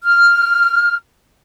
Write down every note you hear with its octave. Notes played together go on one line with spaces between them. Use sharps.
F6